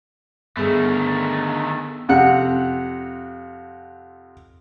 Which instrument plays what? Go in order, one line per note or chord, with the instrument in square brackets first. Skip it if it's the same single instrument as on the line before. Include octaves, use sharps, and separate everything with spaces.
[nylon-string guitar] G2 D3 [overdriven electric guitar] D#3 A3 [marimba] B3 G#4
[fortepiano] F2 C3 F#5